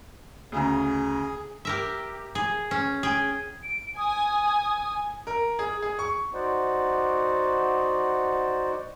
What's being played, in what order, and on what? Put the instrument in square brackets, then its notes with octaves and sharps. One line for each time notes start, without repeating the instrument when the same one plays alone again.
[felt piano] D2 C#3 A#5 [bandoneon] G#4
[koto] G4 A#4 E5
G#4
C#4
G#4 G5
[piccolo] D7
[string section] G#5 [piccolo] D#6
[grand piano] A#4
G#4
G#4
C#6
[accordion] D#4 F#4 C5 D5 F#5